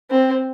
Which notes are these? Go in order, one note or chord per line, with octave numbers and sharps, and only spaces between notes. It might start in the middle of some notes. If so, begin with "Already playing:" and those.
C4